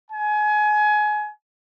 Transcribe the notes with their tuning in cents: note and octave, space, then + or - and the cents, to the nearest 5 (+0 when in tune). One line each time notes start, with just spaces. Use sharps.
G#5 +25